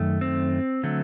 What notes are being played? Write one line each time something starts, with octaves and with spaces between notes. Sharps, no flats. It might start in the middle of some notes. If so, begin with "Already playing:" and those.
Already playing: F#2 D#3 A3
C4
D3 F#3 A3